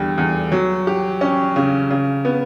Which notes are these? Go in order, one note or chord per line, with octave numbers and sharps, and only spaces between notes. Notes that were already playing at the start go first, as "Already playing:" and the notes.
Already playing: E2 D3 G3
E2
F#3
G4
C#4
C#3
C#3
B3